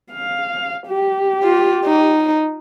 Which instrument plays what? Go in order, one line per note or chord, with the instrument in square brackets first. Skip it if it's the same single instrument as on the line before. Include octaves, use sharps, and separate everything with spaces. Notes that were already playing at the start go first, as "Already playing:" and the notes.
[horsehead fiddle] F5
G4
[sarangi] F4
D#4